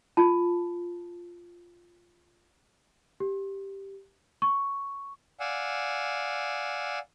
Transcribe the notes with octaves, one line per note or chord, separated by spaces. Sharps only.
F4 A5
G4
C#6
D5 F5 F#5 G#5 E6